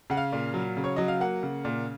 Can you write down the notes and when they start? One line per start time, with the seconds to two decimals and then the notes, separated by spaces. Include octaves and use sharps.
0.10 C#3 F#5
0.17 F5
0.32 A#2
0.54 F#3
0.77 C#3
0.84 C#5
0.96 F#3 D#5
1.08 F5
1.20 A#3 F#5
1.43 C#3
1.65 A#2